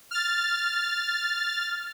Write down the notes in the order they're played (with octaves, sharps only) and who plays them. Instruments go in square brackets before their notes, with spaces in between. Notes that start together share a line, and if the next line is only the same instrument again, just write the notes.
[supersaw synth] F6 A6